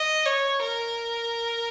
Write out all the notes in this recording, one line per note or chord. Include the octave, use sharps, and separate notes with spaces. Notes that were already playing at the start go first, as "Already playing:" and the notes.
Already playing: D#5
C#5
A#4